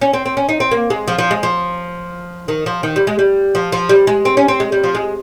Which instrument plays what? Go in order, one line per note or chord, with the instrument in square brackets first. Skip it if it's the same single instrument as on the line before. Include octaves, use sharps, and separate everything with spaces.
[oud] C#4
C4
C4
C#4
D#4
C4
A#3
G#3
F3
F3
G#3
F3
D#3
F3
D#3
G3
G#3
G3
F3
F3
G3
G#3
C4
C#4
C4
G#3
G3
F3
G#3